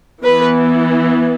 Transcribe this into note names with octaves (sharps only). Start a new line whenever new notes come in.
E3 B3 B4